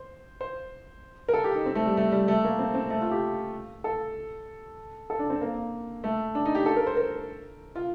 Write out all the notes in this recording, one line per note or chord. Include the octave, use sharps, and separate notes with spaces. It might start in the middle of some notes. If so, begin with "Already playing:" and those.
Already playing: C5
C5
A#4
A4
G4
D#4
C4
A3
G3
A3
G3
A3
A#3
C4
C4
A3
F4
G4
A4
A4
D4
C4
A#3
A3
D4
D#4
G4
A4
A#4
C5
A#4
F4